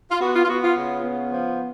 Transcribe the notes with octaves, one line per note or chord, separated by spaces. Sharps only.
F4
B3 F#4
F4
F4
B3 F#4
F4
C#3
B3
F3